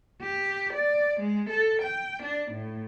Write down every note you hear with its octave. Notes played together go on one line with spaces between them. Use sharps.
G4
D5
G#3
A4
G5
D4
A2